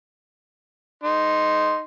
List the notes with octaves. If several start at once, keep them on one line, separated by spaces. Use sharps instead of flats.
D#4 C6